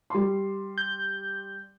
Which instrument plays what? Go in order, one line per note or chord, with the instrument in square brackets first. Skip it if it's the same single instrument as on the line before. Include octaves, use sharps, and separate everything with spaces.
[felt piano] G3 C6
[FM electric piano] G6